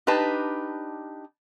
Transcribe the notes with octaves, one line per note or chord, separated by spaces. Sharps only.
D4 D#4 G4 B4 A5